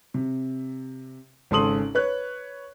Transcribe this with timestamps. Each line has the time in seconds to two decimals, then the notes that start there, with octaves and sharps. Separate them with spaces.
0.14 C3
1.51 G#1 C#3 A4 C6 D#6 F#7
1.95 B4 C#5 F#6